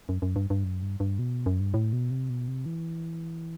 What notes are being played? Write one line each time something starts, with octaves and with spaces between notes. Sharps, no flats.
F#2
F#2
G2
G2
F#2
G2
G2
B2
F#2
G2
A2
B2
C3
B2
C3
E3